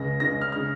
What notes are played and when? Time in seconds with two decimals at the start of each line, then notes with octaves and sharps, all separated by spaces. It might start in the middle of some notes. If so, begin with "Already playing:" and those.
Already playing: C#2 C#3 A#6
0.20 C#2 C#3 A#6
0.41 F6
0.52 C#3 F6